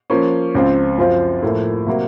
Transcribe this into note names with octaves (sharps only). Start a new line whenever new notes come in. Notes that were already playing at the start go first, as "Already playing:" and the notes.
F3 A#3 C#4
C#2 C#3 F3 C4 F4
F#2 F3 C4 F4 C5
A2 F3 A#3
C3 F#3 A#3